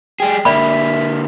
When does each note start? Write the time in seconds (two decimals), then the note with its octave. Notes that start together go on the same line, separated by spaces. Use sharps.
0.20 G3 G#4 G5
0.45 D3 A#3 D5 E5 B5